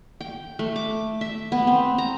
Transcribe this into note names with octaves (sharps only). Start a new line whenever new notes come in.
G5
A3
D6
E5
B3
C4
A#5